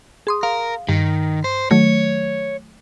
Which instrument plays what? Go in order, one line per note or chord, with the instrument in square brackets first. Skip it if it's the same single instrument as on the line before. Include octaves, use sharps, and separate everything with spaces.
[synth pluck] G#4 C6 D#6
[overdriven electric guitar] A#4 [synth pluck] F5
[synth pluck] G2 [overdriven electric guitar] D#3
[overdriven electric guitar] C5
[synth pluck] D#3 F#3 A3 [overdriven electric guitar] C#5